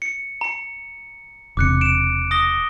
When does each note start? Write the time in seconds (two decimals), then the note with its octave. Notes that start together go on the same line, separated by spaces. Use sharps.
0.02 C#7
0.41 A#5 C#7
1.57 E1 C3 D6 F#6 C#7
1.81 D7 E7
2.31 D#6 A#6 G7